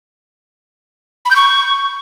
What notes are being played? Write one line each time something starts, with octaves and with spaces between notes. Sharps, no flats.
B5
G6
C#6